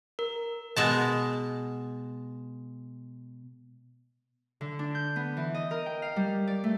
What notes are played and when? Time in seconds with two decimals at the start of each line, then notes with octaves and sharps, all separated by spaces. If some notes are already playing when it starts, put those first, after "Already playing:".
0.19 A#4
0.76 B2 G#3 A5
4.61 D3
4.79 D4
4.95 G6
5.16 B3
5.37 E3
5.54 D#5
5.71 A#4
5.86 G5
6.02 F5
6.16 G3
6.47 D5
6.64 A3